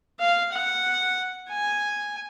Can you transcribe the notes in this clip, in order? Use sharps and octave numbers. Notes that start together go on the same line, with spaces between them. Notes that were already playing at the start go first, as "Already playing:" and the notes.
F5
F#5
G#5